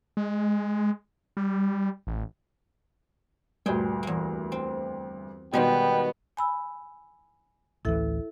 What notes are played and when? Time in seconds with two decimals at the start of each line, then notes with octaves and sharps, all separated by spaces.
0.17 G#3
1.37 G3
2.07 A1
3.66 D2 G2 A#2 G#4 G5
4.03 E2 A#3
4.52 C4
5.53 B2 D#3 G3 G#3 B3 G5
6.37 G#5 B5 E6
7.85 A1 D2 E3 E4 A4 E5